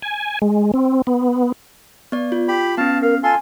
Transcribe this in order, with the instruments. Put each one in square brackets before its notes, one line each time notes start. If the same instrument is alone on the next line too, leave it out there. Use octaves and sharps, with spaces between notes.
[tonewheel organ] G#5
G#3
C4
B3
[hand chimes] B3 D5
F4
[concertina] G4 B5
[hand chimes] B3 C#4 [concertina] F5 A5
[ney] A#4 [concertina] F5
[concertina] F4 A4 C6 [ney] G#5